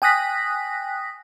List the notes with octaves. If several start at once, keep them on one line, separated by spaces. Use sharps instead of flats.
G5 G#5 D#6 F#6 A#6 B6